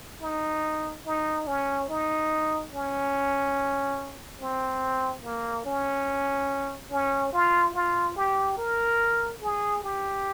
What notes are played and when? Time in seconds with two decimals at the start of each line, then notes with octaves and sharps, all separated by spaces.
0.22 D#4
1.06 D#4
1.47 C#4
1.89 D#4
2.72 C#4
4.40 C4
5.23 A#3
5.65 C#4
6.91 C#4
7.33 F4
7.74 F4
8.16 G4
8.58 A#4
9.42 G#4
9.84 G4